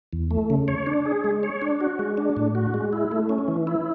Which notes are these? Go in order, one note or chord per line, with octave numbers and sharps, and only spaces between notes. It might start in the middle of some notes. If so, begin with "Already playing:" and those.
E2
A3
C#3
C#5
D4
G#4
G#3
C#5
D4
F#4
G#3
D4
A2
F#4
G#3
E4
A3
C#4
E3
E4